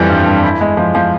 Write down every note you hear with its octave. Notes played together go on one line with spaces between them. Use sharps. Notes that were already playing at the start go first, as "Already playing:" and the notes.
Already playing: F2 E3 G3
G2
G2
E4
G#3
F3
F3